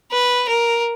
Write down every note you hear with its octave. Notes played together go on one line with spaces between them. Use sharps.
B4
A#4